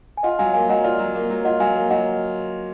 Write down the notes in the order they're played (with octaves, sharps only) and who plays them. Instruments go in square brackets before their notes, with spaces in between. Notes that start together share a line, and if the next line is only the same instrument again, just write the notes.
[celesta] G#5
[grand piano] F4 [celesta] D#5 F#5
[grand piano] F#3 [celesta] F5 G#5
[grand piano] A#3 [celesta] F5 G#5
[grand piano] F#3 [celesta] D#5 F#5
[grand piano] F4 [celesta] D5 F5
[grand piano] F#3
A#3
F#3
[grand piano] F4 [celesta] D#5 F#5
[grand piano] F#3 [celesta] F5 G#5
[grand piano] A#3
[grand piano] F#3 [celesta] D#5 F#5